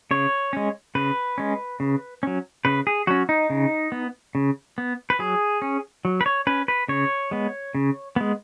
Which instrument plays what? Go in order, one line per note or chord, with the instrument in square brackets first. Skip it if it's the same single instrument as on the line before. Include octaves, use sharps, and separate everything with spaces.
[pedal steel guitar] C#3 C#5
G#3 C#4
C#3 B4
G#3 C#4
C#3
F#3 C#4
C#3 B4
G#4
F#3 C#4 F#4
D#4
C#3
B3
C#3
B3
B4
F#3 G#4
C#4
F#3
B4
C#5
C#4 B4
B4
C#3 C#5
G#3 B3
C#3
G#3 B3